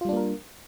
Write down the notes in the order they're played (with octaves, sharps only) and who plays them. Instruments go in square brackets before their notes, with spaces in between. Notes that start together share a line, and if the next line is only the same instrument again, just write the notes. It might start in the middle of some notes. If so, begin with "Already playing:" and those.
[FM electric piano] F4
G3
D4
A#3
A#4